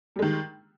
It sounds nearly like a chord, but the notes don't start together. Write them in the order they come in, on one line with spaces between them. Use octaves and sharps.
G3 G#3 D#3